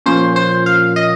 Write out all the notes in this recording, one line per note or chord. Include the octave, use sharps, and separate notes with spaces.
A#2 F3 A#3 C#4 C5
C5
F5
D#5